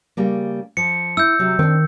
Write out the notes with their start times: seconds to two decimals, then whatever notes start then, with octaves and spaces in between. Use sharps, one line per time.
0.17 C#3 G3 A#3
0.77 F3 C#7
1.17 E4 E6 G6
1.39 C3 F#3
1.59 D#3 C4 D4